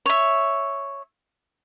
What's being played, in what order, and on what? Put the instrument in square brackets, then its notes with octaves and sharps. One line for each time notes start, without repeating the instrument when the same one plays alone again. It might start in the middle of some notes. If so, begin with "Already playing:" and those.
[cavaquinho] C#5 E5